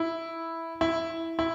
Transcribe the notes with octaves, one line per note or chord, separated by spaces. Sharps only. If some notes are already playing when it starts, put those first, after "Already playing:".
Already playing: E4
E4
E4